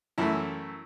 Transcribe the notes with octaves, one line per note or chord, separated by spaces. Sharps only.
F#2 E3 A3 E4